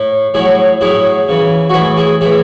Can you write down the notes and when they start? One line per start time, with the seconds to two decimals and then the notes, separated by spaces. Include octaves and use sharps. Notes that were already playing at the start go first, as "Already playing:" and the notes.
Already playing: A2
0.34 A2 F#3 E4 G#4
0.81 A2 F#3 E4 G#4
1.28 C#3 E3
1.69 F#4
1.74 A2 E3 E4 G#4
1.97 E4 G#4
2.21 A2 E3 E4 G#4